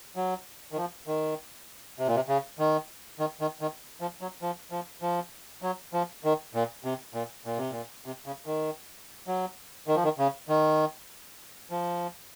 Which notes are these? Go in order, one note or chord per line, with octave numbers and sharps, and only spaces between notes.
F#3
D#3
F3
D#3
C3
A#2
C3
C#3
D#3
D#3
D#3
D#3
F3
F#3
F3
F3
F3
F#3
F3
D#3
A#2
C3
A#2
A#2
C3
A#2
C3
C#3
D#3
F#3
D#3
F3
D#3
C#3
D#3
F3